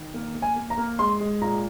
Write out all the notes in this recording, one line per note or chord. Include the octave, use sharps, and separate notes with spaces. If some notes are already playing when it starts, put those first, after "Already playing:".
Already playing: D#3
A#3
A#3
G#5
A#3
A#5
A#3
G#3 C6
G#3
A#2 A#5